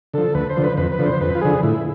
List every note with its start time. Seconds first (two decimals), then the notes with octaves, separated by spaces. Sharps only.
0.14 D3 F3 A4
0.35 D2 B4
0.50 C5
0.56 D3 F3
0.64 B4
0.77 F2 B4
0.92 B4
0.99 D3 F3
1.06 C5
1.21 F2 B4
1.35 F4
1.41 D3 F3 G#4
1.63 A2 E4